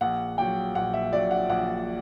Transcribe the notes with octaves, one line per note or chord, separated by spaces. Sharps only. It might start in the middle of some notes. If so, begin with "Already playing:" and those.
A#1 F#5
A#2 F#3 G5
A#1 F#5
E5
A#2 F#3 D5
F#5
A#1 F#5